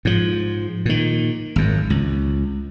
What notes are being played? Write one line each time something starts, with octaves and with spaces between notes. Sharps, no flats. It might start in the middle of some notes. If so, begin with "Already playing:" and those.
G#2 F3
A#2 D#3
G#1 F#2
C#2